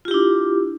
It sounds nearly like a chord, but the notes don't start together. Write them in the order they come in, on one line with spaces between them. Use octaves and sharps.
F4 G4 E4 D4